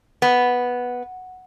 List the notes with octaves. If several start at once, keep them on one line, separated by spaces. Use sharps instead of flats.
B3